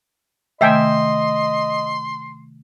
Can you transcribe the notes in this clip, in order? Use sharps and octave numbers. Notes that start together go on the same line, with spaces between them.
C3 D#3 A3 D#5 E5 G5 G#5 C6